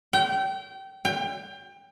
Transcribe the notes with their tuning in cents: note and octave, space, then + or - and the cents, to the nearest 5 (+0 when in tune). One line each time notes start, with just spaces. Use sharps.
G5 -25
G5 +25